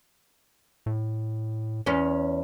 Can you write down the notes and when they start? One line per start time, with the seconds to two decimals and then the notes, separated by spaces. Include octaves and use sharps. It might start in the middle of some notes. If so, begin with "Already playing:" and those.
0.86 A2
1.86 E2 C#4